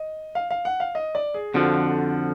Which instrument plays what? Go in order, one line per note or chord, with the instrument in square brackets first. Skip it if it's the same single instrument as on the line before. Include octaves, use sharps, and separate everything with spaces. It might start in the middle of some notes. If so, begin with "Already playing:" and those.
Already playing: [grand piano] D#5
F5
F5
F#5
F5
D#5
D5
G#4
[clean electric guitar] F2 D3 F3 [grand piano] F#4